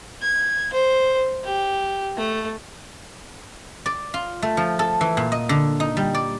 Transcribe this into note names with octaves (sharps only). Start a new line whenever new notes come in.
G#6
C5
G4
A3
D5
F4
A3
F3
A4
E3
A#2
D#5
D3
D#4
G3
D5